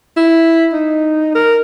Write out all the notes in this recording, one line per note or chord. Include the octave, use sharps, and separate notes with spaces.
E4
D#4
A#4